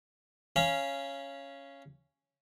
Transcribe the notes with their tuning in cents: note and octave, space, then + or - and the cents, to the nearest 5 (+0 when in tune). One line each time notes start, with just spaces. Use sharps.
C#4 +0 F5 -20 B5 -35